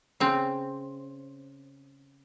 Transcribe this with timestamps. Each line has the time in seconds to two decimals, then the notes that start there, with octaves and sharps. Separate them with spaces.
0.20 C#3 C4